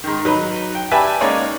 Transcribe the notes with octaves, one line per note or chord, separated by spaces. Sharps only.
G#2 D#3
F#3 D#4 B4
G5
G4 B4 D5 E5 G#5 A5
G#3 A#3 C#4 D#4 C#5 D5